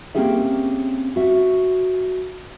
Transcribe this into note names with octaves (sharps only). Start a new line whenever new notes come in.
A#3 C4 C#4 G4 G#4 E5
F#4 E5